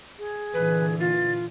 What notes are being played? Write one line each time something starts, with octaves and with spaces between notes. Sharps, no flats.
G#4
A#2 D3 E3 B4
F4 A6